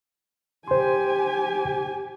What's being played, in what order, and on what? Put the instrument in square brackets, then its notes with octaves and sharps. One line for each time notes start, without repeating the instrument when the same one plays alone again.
[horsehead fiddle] G4 G#5 [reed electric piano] C5 C6